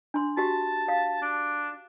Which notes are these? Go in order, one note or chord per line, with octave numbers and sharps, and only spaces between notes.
D4 C6
F#4 G4 A5
F5
D4